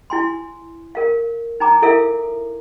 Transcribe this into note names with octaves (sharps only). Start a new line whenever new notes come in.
E4 G#5 C6
A#4 F5
D#4 G#5 A#5 D6
E4 A4 A#4 E5 F5